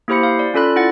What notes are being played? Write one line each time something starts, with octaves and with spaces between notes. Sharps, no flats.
A#3 E4 G4 C5 B5 C#7
F5
D5
C#4 F4 A4 D5 B5 F#6
E4 F4 F#5 A6